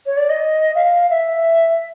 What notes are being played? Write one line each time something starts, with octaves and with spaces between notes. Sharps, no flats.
C#5
D5
D#5
F5
E5